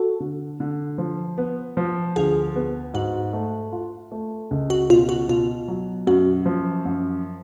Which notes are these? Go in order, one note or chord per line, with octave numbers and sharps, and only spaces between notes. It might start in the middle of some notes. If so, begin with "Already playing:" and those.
Already playing: F#4 A4
D3
D3
F3
B3
F3
D2 F4 G#4
B3
G#2 F#4
A3
F4
A3
C#2
F#4
B2 F4
F#4
B2 F4
F#3
F#2 F#4
F3
F#2